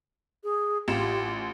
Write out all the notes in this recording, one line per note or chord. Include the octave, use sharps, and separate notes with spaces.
G#4
A1 F4 G4 E7